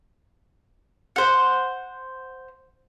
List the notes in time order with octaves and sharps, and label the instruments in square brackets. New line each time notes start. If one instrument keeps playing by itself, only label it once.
[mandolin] C5 F#5